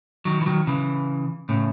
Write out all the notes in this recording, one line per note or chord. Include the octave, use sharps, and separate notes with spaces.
D#3 F#3
E3
D#3 F#3
C#3 E3
A2 C#3